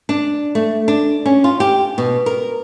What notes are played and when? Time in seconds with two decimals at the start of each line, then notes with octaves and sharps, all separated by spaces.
0.09 D4
0.55 A3
0.88 D4
1.26 C#4
1.44 F4
1.60 G4
1.98 B2
2.26 A#4